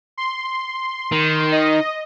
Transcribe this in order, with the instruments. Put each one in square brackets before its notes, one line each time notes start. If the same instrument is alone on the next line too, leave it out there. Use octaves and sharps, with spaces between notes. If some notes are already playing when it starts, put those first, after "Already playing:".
[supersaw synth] C6
[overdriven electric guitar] D#3
[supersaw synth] D#5